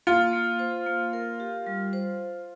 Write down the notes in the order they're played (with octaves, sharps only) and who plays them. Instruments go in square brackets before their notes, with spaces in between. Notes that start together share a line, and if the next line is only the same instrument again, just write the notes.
[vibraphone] A#3 [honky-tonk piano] F4
[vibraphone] A#3
C5
A#3
A#4
G4
G3
C5